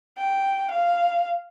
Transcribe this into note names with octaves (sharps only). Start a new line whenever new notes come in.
G5
F5